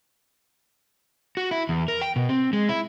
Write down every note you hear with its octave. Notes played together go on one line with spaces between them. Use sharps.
F#4
E4
E2
A#4
G5
B2
C4
G#3
E4